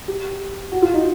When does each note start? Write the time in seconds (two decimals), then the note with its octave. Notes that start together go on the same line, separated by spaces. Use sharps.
0.08 G4
0.72 F#4
0.82 F4
0.94 D#4